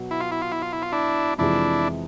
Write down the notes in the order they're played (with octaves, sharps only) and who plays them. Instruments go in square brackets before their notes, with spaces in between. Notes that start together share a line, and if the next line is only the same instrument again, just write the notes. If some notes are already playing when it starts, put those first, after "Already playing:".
Already playing: [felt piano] B2 F#3
[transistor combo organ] E4
F4
E4
F4
E4
F4
E4
F4
D4 E4
[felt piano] F2 C3 E3 G#3 [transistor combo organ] D4 E4